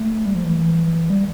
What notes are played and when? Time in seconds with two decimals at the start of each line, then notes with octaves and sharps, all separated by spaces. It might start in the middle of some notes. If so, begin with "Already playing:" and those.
Already playing: A3
0.26 G3
0.35 F3
0.44 E3
1.10 G3